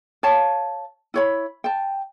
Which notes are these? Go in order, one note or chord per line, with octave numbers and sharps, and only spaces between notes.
C#5 F5 A5
E4 C#5 B5
G5 A5